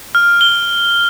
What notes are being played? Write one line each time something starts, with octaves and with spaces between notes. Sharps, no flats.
F6
G7